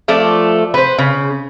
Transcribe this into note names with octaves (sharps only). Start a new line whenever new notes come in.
F3 A3 D5
B4 C5
C#3